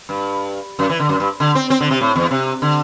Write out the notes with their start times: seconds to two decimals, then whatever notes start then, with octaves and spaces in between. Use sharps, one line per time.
0.09 G2
0.79 F#2
0.89 E3
1.00 D3
1.09 F#2
1.20 G2
1.40 D3
1.55 C4
1.70 C4
1.81 D3
1.90 C3
2.01 A2
2.15 E2
2.31 C3
2.62 D3